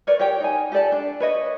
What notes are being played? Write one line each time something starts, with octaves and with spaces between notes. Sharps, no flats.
A#4 B4 C#5 D5
G4 A#4 C#5 G5
D#4 G#5
G4 A4 D5 A5
D4
B4 C#5 D#5